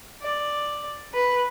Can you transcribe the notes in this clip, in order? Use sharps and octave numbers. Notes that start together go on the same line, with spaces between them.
D5
B4